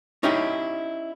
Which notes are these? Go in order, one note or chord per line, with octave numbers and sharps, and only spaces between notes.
C#4 D#4 E4 G4